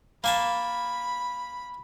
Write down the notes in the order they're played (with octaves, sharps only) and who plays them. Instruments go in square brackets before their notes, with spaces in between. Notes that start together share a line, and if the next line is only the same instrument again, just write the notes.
[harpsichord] A#3 G#5 A5 [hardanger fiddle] B5